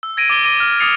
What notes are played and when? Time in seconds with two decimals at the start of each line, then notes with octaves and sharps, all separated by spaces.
0.03 E6
0.17 G#6 A#6 D7 D#7
0.30 D6 A6 G7
0.45 D6 A#6 D#7
0.60 F6
0.80 D6 D#6 A6 C7 C#7 F7